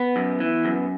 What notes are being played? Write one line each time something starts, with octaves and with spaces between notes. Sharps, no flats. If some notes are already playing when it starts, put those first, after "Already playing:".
Already playing: B3
F#2
E3
F#2